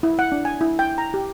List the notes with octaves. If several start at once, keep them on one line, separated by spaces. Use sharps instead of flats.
E4
F#5
D4
G#5
E4
G5
A#5
G4